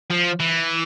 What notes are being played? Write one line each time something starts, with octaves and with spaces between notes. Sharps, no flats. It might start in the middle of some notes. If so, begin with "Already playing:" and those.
F3
E3